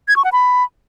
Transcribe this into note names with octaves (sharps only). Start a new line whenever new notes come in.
G#6
C#6
F#5
B5